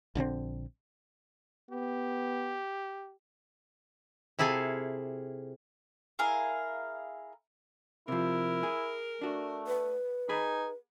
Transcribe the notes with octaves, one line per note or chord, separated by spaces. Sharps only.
A#1 D3 D#3 C4
B3 G4
C3 E4 F4 G#4 A4 G#5
E4 G#4 A#4 F5
C3 F3 E4 A#4
G#4
A3 D4 F#4
B4
D#4 G#4 G#5 B5